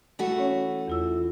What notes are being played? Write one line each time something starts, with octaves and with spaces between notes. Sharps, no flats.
E3 A3 F#4
C#4 C#5
E2 F4 E6